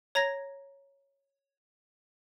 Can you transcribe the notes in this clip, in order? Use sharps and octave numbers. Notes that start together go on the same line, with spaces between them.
C#5 A#5 G#6 A#6